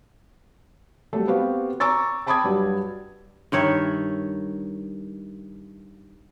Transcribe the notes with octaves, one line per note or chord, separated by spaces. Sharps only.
F#3 G3 A3 A4
B3 C4 F#4 G4 F5
A#5 C#6 D6 E6 A6
G5 A5 B5 D6 D#6 G#6
G2 F#3 G3
G2 D#3 C#5 E5